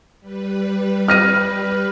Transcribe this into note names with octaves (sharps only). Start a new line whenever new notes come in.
G3 B4
F6 A#6 D#7